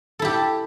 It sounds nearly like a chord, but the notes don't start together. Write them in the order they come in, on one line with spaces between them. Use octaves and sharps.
A4 E4 G4